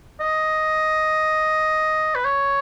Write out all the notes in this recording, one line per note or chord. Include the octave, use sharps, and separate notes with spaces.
D#5
B4
C#5